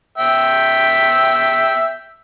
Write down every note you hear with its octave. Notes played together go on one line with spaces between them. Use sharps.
E5 G5